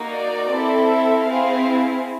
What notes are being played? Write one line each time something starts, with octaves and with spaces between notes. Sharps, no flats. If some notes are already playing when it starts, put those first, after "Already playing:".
Already playing: A#3 D#4 F#4
D5
C4 E4 A4
E5
C4 E4 G#4 F5